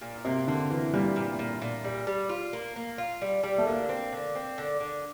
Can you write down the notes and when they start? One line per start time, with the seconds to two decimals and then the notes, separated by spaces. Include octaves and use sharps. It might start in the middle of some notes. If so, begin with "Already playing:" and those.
0.01 A#2
0.25 C3 A#3
0.48 D3 A#3
0.70 E3 A#3
0.93 A#2 G3
1.16 A#2
1.39 A#2
1.62 A#2
1.84 G3
2.07 G3
2.29 F4
2.53 A#3
2.76 A#3
2.98 F4
3.22 G3
3.43 G3
3.58 A3
3.66 D3 A#3
3.89 C4
4.12 D3
4.35 C4
4.58 D3
4.80 D3